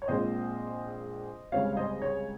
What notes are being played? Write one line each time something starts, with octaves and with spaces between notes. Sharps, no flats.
C#5
A#1 A#2 G#3 C4 C5 D#5
C#2 C#3 G3 C4 C#5 F5
F5
C5 D#5
C#5